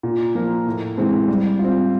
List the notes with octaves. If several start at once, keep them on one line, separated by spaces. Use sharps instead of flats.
A#2
F3 A#3
A2
E3 G#3 C4
G3
F4
C4